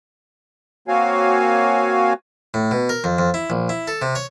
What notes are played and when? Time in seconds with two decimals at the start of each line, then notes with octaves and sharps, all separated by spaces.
0.88 A#3 C4 F#4 C#5 F5 G#5
2.54 A2
2.71 B2
2.89 A#4
3.04 F2
3.19 F2
3.34 E4
3.50 A#1
3.69 E4
3.88 A4
4.02 C3
4.15 C#5